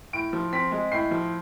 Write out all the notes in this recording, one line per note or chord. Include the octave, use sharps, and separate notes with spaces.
A2 D7
F3
C4 B6
G#3
A2 C7
F3